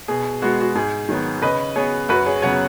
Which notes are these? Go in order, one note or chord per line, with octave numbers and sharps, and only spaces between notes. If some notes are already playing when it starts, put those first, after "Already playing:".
B2 G#4
G#3 B3 F#4
F#4
G#2 G#4
D#3 F#3 B3
C#3 B4 D#5
B3 G#4 C#5
F#2 F#4 B4
G#4 C#5
C#3 F#3 B3 C#5 F#5